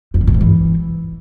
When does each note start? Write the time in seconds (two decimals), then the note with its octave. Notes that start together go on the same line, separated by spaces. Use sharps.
0.14 F2
0.21 D3
0.27 A2
0.34 G#2
0.41 E3